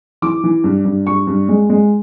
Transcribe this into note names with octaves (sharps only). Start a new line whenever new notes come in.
E3 D6
E3
G2
G2
G2 C#6
G2
G#3
G#3